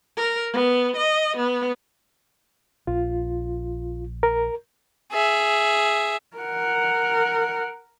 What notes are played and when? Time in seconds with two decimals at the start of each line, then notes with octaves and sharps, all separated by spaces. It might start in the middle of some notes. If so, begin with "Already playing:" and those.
0.17 A#4
0.53 B3
0.96 D#5
1.37 B3
2.87 A#1 F4
4.23 A#4
5.12 G#4 E5
6.37 A#4 F#5